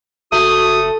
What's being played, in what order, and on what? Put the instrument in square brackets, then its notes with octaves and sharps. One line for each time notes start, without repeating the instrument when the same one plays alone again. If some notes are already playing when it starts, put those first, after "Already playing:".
[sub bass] F#1 [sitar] A3 [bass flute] F#4 [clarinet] D#6